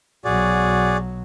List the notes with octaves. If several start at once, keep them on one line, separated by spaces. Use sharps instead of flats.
B1 F#3 F#4 G#4 D5